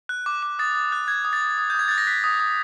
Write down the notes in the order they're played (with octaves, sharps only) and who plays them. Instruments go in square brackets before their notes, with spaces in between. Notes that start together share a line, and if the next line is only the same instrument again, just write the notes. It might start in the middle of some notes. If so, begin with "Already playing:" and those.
[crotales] F#6
D6
D6
D#6 A6
D#6
F#6
F#6 G#6
D#6
A6
D#6
D#6
G6
D#6 G#6
F#6 A6
A#6
F#6 B6
D#6
D#6